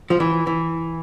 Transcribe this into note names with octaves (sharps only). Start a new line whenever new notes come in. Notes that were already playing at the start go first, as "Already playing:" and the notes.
F3
E3
E3